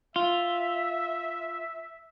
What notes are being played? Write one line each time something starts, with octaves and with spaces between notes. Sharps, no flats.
F4 E5